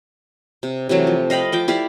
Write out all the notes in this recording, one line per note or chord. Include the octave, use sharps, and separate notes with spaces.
C3
C3 E3 F#3 A3
F3
D#5 F5 G5 B5
F3 G5 D6
E4 G4 D5 F5